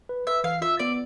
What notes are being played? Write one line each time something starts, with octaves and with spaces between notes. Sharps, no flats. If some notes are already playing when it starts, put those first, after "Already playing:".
B4
B4 E5
E3 F5
F4 E5
B3 D5